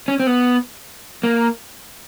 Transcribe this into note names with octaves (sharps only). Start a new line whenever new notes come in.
C#4
C4
B3
A#3